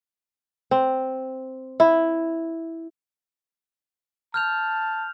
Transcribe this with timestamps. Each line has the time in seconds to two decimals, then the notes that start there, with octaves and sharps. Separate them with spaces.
0.71 C4
1.80 E4
4.34 A5 F6 G6 F7